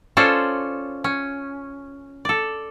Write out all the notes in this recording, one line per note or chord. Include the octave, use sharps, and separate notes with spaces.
C#4 F4 A4 C5 D5
C#4
A4 D5